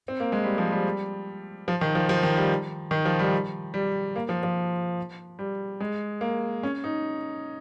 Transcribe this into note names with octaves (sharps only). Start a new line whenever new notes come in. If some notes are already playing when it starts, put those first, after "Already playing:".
C4
A#3
G#3
G3
F3
G3
F3
D#3
F3
F3
D#3
G3
D#3
F3
G3
G3
A#3
F3
F3
G3
G#3
A#3
C#4
D#4